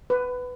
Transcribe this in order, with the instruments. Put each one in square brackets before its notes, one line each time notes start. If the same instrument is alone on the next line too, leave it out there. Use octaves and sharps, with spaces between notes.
[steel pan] B4